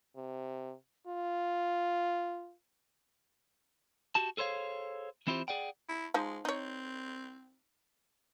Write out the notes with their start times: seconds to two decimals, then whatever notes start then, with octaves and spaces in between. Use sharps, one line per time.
0.16 C3
1.07 F4
4.15 F#4 G4 A5
4.37 G#4 A4 C5 C#5 F5
5.27 E3 C4 E4 F4 G4 C5
5.48 G#4 D5 F#5 G5
5.89 E4
6.14 F3 G#3 D#4
6.45 C4 D#4 C#5